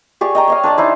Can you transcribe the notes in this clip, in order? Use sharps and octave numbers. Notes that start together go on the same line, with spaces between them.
G4 G#4 D5 C#6
D#5 G5 A#5
C#5 D#5 F5
D4 C5 D5 A5
D#4 E4 C5 G#5